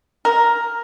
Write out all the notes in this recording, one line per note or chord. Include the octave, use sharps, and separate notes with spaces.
A#4